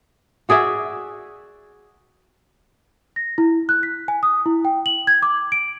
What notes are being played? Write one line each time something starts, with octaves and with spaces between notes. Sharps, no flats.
F#4 G#4 D5 E5
A#6
E4
F#6
B6
G#5
D#6
E4
G5
F#7
G#6
D6
D7